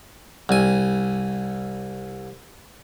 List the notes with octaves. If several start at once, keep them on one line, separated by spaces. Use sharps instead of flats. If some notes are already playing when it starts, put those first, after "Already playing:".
C2 G#5